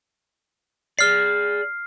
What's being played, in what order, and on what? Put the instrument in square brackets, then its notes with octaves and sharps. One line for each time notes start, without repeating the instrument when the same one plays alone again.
[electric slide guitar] G#4 D5 [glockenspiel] F6 C7